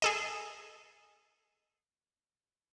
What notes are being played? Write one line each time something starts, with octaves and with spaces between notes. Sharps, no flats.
G#4 A4 D#5